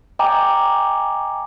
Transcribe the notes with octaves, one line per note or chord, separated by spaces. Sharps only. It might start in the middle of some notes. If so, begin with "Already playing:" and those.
D#5 G5 G#5 A#5 D6